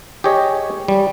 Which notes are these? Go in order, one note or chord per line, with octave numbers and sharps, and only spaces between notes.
G4 G#4 C#5 D#5
G3